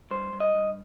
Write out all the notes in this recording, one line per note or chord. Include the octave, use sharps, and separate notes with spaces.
G2 C5
G2
D#5
G2